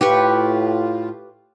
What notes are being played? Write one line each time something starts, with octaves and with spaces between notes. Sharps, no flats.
A2 F4 G4 B4 C#6